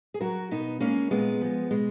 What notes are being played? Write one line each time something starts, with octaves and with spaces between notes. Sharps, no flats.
G#4
F#3 F#4 A#4
B2 B3 D#4
G#3 A#3 C#4
A#2 G#3 B3
F3 G#3
B2 G#3